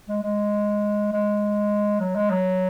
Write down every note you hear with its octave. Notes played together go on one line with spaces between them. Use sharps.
G#3
G#3
G#3
F#3
G#3
F#3